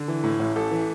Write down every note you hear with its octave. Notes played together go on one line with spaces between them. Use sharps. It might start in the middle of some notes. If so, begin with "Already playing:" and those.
Already playing: D3
E3
A2
A1
A1 A4
E3